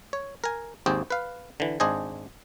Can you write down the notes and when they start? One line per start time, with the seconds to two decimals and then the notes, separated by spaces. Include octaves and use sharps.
0.13 C#5
0.44 A#4 G#5
0.86 G#1 D#2 C4 G4 G#4 G5
1.10 B4 F5
1.60 D3 E3
1.80 G#1 D4 G#4 C5 D#5 G#5